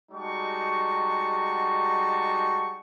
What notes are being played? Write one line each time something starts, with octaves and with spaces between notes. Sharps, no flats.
G3 G#3 D#4 F#4 A5 C#6